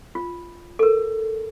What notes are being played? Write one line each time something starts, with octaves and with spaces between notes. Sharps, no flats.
F4
A4 A#4